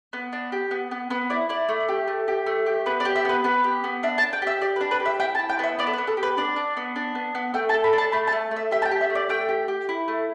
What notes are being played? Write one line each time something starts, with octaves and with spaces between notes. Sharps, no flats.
B3
D4
G4
B3
B3
B3 B4
E4 D5
E4 D5
A3
G4
A3
G4
A3
G4
B3 B4
D5
G4
E5
B3 B4
B3 B4
G4
B3
D4 E5
A5
D4
G5
G4 E5
G4 D5
B4
D4
B4
G4
E5
E4 G5
A5
E4
G5
B3 E5
B3 D5
A4
B4
B3
A4
G4
B4
D4 D5
D4
B3
D4
B3
B3
A3 G5
A5
A4
B5
D4
A5
A3 B5
A5
A3
A3
E5
G4 E5
A5
G5
G4
E5
A3
D5
A3 G5
G4
G4
E4
A3